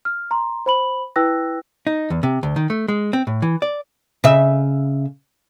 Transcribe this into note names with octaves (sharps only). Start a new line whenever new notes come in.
F6
A#5 C6
C5 B5 F#7
E4 B4 G5 E6 F#6 A#6
D#4
E2
C3
D2
D#3
A3
G#3
C4
A2
E3
D5
C#3 E5